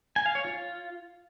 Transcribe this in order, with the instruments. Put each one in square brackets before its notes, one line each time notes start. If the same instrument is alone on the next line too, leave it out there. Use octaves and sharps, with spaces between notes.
[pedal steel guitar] G#5
F5
C#5
F4